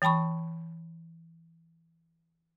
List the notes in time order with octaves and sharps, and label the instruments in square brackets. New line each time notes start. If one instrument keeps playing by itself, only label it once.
[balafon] E3 G5 A5 B5 C#6